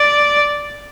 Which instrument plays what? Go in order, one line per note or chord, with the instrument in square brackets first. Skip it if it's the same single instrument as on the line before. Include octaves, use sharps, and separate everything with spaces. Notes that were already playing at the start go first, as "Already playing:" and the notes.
Already playing: [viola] D5